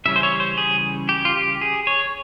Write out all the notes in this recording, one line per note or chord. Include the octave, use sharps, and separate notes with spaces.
C#3 E3 G3 C#4 E5
C5
C#5
C5
G#4
G4
F4
G4
G#4
C#5